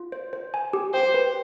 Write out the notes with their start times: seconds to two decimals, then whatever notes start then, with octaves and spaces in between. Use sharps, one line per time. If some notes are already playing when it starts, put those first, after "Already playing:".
Already playing: F4
0.12 C5
0.33 C5
0.54 G#5
0.73 G4
0.94 C5 G5
1.14 B4